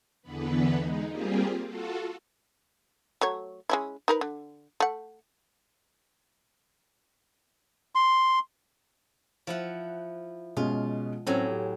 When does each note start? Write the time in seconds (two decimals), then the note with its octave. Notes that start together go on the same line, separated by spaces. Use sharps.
0.22 E2 D3 E3 B3 B4
0.77 G#3 D#4
1.08 G3 A#3 C4 F4 G4 G#4
1.65 F4 F#4 A4
3.21 F#3 A3 C#5
3.70 G#3 C#4 E4
4.08 D#4 A#4 B4
4.21 D3
4.80 A3 F#5
7.95 C6
9.47 F3 E4 F#5
10.57 B2 G#3 C#4 F4
11.27 A2 F#3 C4 C#4 G#5
11.47 G4